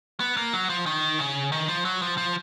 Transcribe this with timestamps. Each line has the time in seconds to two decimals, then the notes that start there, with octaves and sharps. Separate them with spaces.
0.20 B3
0.37 A#3
0.54 F#3
0.70 F3
0.86 D#3
1.19 C#3
1.52 D#3
1.68 F3
1.85 F#3
2.02 F3
2.18 F3